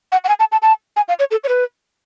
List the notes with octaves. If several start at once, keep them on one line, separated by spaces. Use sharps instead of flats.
F#5
F#5
G#5
A5
A5
A5
G#5
F5
C#5
A4
C#5
B4